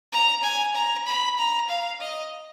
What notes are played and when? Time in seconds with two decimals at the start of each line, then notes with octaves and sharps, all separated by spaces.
0.12 A#5
0.43 G#5
0.75 A#5
1.06 B5
1.37 A#5
1.69 F5
2.00 D#5